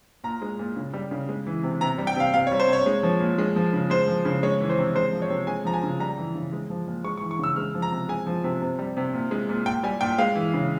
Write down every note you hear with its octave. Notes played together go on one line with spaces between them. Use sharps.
A#2 A#5
G#3
A#2
C#3
G3
C#3
G#3
E3
C3
C3 A#5
G3
G5
C3 F5
C3 F5
C#5
G3
C5
C3
C#5
G#3
F3
A#2
G#3
F3
C#3
G#3 C5
F3
C#3
G#3 C#5
E3
C5
C3
G#3 C5
F3
C#5
C3
G#3 G#5
F3 A#5
G#5
C#3
G3 A#5
E3
C#3
G#3
F3
A#2
G#3 C#6
C#6
E3
C#6
C#3 E6
G#3 F6
F3
A#5
C3
G#3 G#5
F3
C3
C3
G3
C3
A#2
G#3
A#2
A#2 G5
G3 G#5
A#2 G5
G#3 F5
E3
C#3